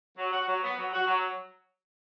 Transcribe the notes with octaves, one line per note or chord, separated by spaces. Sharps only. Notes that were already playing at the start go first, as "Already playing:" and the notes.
F#3
F#4
F#3
B3
F#3
F#4
F#3